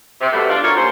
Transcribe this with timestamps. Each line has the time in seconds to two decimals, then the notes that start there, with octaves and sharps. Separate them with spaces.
0.21 C3
0.33 B2 G3 A3
0.49 D4 F4
0.63 D4 F4 F#4 A4 A#4 C#5
0.76 D#2 C5